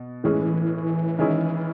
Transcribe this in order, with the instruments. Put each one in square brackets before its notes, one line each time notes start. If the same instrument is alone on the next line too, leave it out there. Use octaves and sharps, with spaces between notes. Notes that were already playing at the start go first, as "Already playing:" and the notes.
Already playing: [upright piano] B2
[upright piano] A2 G#3 C#4 G#4 [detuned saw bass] E3
[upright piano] D#3 G#3 C#4 E4 G#4